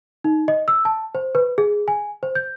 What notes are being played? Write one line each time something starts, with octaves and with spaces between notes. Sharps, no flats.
D#4
D#5
E6
A5
C5
B4
G#4
G#5
C5
G6